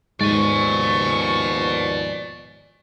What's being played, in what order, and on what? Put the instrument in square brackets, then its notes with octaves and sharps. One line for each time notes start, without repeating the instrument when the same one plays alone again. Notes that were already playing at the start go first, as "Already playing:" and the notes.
[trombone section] D#2 B2 F3 [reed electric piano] G#2 G#3 [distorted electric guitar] D5 G#5 [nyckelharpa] C#6